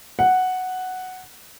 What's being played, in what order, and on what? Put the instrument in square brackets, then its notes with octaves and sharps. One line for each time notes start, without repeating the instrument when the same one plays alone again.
[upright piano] F#5